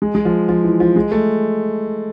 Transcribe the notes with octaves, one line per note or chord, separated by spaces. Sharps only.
G#3
G#3
F3
F3
E3
F3
G#3
A3